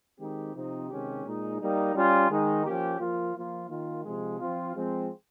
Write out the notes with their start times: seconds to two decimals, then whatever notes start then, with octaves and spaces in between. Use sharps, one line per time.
0.19 D#3 G#3 C4 D#4 G4
0.54 C3 F3 C4 D#4
0.88 C3 D#3 G#3 C#4 G4
1.23 A#2 G#3 D#4
1.59 G3 A#3 D#4
1.93 G3 C#4 F4
2.29 D#3 G#3 D#4
2.64 F3 A#3 C#4 G4
2.99 F3 A#3 F4
3.34 F3 A#3 F4
3.69 D#3 A#3 F4
4.04 C3 F3 G#3
4.39 F3 C4 F4
4.73 F3 G#3 C4